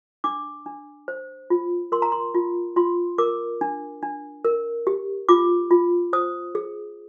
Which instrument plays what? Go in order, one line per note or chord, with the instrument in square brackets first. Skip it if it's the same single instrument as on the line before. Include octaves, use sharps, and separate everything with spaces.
[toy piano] D4 D6
D4
C5
F4
A#4 C6
A#5
C6
F4
F4 C6
A#4 D6
D4
D4
A#4
G4
F4 D6
F4
C5 D#6
G#4